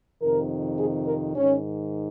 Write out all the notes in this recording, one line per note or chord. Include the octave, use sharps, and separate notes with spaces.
F2 C3 D#3 A#4
G#4
A#4
G#2 D#3 C#4